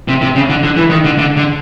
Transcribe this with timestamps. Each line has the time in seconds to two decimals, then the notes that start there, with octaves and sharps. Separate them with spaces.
0.08 C3
0.22 C3
0.36 C#3
0.49 D3
0.63 D3
0.77 E3
0.91 D#3
1.04 D3
1.18 D3
1.37 D3